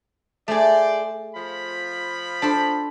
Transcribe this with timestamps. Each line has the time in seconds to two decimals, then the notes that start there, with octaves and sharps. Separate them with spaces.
0.48 A3 G#4 C5 D5
1.35 F3 F4 B5
2.42 D4 A4 C5